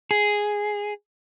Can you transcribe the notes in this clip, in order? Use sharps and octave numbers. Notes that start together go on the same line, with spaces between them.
G#4